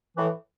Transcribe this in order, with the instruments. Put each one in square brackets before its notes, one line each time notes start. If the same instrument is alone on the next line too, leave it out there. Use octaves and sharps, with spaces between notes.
[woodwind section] A2 E3